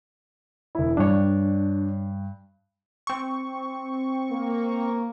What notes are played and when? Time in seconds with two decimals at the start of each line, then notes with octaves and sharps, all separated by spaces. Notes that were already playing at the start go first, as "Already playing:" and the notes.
0.75 E1 E4
0.97 G2 D4 C#5
3.07 C4 C#6
4.30 A#3